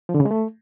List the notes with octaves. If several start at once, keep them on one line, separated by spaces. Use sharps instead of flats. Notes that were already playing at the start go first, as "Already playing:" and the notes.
F3
D3
C#3
G#3
A3